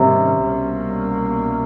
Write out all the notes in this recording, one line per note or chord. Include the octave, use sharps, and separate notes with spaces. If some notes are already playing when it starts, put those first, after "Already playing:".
Already playing: G#2 C3 D#3 G3 A#3 C#4
C2 B2 G3 A#3 C#4